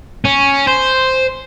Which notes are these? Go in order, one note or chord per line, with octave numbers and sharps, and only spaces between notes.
C#4
C5